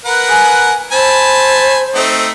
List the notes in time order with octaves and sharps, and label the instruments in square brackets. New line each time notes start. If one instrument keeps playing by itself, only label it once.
[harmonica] A#4 B4 F#5
[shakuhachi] G#5
[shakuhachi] C5 [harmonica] G#5 A5 B5
[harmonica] A3 C4 D#4